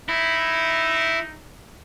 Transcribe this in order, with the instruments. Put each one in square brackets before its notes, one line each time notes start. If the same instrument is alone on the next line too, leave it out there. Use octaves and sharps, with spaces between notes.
[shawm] D#4 [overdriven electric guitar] E4